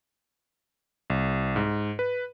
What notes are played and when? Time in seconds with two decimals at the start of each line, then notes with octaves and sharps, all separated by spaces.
1.10 C2
1.56 G#2
1.99 B4